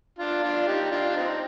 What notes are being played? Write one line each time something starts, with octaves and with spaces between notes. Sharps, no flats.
D4 F4
D4 F4
D#4 G4
D4 F4
D4
C4 D#4